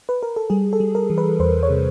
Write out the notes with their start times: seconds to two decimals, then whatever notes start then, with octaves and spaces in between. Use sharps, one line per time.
0.09 B4
0.23 A#4
0.36 A4
0.50 G3 G#4
0.73 A4
0.80 G3
0.95 A#4
1.10 E3
1.18 B4
1.40 E2 C5
1.63 C#5
1.70 C3